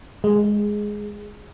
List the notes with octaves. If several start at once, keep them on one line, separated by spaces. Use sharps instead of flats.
G#3